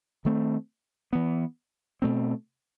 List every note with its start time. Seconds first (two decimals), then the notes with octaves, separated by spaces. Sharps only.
0.25 D#3 A3 C4
1.13 E3 B3
2.02 B2 A3 C4